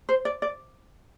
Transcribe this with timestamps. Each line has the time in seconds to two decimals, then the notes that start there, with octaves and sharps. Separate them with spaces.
0.09 C5
0.25 D5
0.42 D5